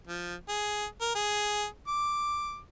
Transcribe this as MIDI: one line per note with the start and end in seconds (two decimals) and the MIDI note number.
0.07 0.35 53
0.49 0.86 68
1.01 1.14 70
1.15 1.66 68
1.88 2.58 86